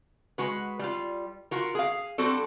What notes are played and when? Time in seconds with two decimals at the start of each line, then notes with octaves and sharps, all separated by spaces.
0.38 G#3 F#4 B4
0.79 G3 F4
1.51 F4 F#4 A#4
1.75 G#4 F5
2.18 G3 C4 D4 F#4 A4